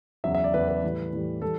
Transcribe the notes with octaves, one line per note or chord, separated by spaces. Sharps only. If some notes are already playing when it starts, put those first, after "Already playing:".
E2 C#3 F#3 E5
E5
D5
E2 C#3 F#3 B4
B4
A2 E3 G3
A2 E3 G3
E3 G3 A4